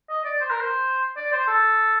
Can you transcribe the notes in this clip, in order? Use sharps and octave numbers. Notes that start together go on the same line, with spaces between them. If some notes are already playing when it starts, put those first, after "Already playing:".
D#5
D5
C5
A#4
C5
D5
C5
A4